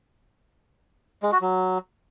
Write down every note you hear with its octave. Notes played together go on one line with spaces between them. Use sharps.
G#3
F#4
F#3